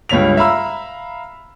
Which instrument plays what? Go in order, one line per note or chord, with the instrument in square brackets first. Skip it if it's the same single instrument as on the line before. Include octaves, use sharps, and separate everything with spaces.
[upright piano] C#2 G2 C#5 B6 F7
E5 F5 A#5 B5 E6